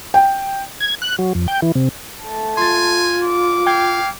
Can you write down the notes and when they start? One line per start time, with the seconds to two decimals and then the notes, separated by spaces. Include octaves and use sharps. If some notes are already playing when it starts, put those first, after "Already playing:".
0.14 G5
0.80 G#6
1.02 F#6
1.19 F#3
1.35 F2
1.48 G5
1.62 E3
1.75 C3
2.23 A3 A5
2.57 F4 G#5 C6 A6
3.24 D6
3.66 F5 G5 G6 G#6